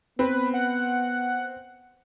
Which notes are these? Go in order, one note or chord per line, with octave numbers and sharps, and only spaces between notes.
B3 C4 B4
F#5